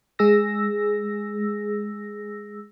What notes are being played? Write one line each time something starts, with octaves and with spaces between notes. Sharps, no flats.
G#3 G#4 E6 A#6